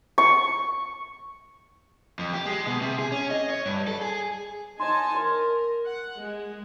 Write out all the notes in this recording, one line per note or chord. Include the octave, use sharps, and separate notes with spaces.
C#6
F2
G4
G#3
B2
C3
G#4
C#4
D#5
C#5
G2
A4
G#4
D#4 C#5 G#5 A5 C6
A#4 C#5 C6
F#5
G#3